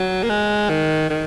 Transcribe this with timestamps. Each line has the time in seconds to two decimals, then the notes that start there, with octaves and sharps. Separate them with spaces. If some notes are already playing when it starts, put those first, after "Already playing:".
Already playing: F#3
0.23 A#3
0.29 G#3
0.69 D#3
1.10 D#3